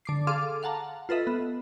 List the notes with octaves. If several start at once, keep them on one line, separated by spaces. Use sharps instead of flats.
D3 D6 C7
G#4 A4 F5 C6 D6 F6
F5 F#5 A5 A#5
F4 A4 B4 D#5 E5
B3